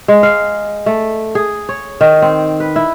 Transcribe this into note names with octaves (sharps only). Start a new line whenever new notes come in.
G#3
F5
A3
G#4
C#5
D#3
C4
B4
E4